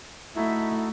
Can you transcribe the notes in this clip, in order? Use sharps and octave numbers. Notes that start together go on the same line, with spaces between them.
A3 D#4 E4 F#4 A4 E5